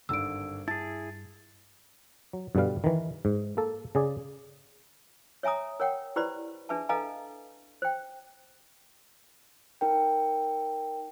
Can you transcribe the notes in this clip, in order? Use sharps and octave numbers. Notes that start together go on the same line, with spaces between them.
G#1 C#2 G2 D3 D4 E6 D7
E4 G#4 A5 A6
F#3
G2 B2 D3 G3 F5
D#3 E3
G#2
A#3 A4
C#3 G#4 D5
C#5 E5 G#5 A#5 D#6
A#4 C#5 F#5 G5
E4 G4 B4 C5 D5 B5
D4 G#4 B4 E5 A5
A4 B4 D#5 F5 G#5 A#5
C5 G5
D#4 A#4 G5